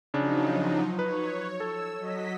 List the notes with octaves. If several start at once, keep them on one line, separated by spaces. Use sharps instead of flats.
C#3 F3 F#3 D4 D#4
B4 C#5
A4 E6
F#3 D#5 B6